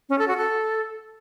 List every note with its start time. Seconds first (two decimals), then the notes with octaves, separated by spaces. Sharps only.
0.09 C#4
0.19 A4
0.28 F#4
0.37 A4